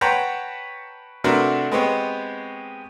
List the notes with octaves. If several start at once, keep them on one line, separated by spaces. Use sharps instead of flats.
B4 C#5 F#5 G5 A5 A#5
C3 A3 D4 F#4 A#4 B4
G#3 B3 C4 G4 C#5